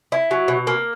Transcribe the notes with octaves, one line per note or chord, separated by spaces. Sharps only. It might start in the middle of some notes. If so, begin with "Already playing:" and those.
E4
F#3
B2
A#3